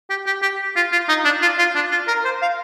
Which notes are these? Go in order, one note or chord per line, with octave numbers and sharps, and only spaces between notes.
G4
G4
G4
F4
F4
D#4
D4
F4
F4
D4
F4
A#4
C5
F5